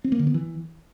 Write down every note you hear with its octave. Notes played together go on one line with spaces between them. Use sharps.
C4
A#3
D3
B3
E3